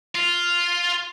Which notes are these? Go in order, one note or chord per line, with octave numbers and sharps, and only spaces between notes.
F4